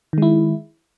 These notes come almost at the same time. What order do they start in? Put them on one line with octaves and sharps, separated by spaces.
D#3 G#3 E4